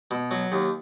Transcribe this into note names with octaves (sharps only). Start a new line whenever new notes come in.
B2
F#3
D#2